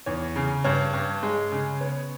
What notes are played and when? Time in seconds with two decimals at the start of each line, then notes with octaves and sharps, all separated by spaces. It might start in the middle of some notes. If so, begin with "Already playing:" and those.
0.06 E2 C#5
0.36 C#3
0.64 G2 C#5
0.94 G2
1.23 G#3
1.52 C#3
1.81 B3 C#5